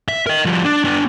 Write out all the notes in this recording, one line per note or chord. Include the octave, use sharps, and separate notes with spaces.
E5
A#4 D#5
F3 G3
D4
B3 D4